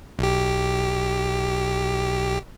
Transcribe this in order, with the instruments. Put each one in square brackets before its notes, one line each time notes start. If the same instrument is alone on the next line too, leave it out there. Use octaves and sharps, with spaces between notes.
[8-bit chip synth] B1 G4